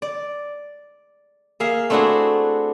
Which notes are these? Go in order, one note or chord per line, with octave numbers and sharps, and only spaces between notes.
D5
A#3 G#4 E5 F5
A3 C4 D4 E4 F#4 G#4